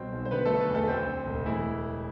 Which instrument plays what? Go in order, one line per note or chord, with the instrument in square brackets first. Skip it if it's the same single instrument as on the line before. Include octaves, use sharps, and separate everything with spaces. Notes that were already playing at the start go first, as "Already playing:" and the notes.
Already playing: [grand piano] C2 B2 F#3 C4 C5
B1
C5
D3 B3 B4
F#3 A3 A4
B3 B4
E2
A3 A4
D2 C4 C5
D3
E1
A2 E3 E4